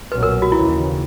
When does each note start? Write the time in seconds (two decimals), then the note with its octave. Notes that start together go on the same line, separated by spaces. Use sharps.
0.12 B1 A#2 F#3 C#4 B4
0.23 A#4
0.42 F#4
0.52 D#2 C#3 E3 E4